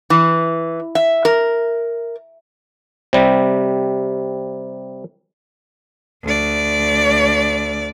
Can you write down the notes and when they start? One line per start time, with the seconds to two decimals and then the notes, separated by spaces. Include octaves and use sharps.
0.10 E3
0.95 E5
1.25 A#4
3.13 C3 G3
6.23 D2 D5